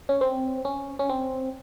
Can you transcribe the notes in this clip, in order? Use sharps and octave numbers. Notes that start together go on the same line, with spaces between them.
C#4
C4
C#4
C#4
C4